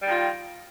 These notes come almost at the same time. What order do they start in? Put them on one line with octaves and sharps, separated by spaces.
G3 D#3 F4